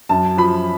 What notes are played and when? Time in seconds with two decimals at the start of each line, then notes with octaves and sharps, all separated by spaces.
0.09 F#2 A5
0.38 F3 B5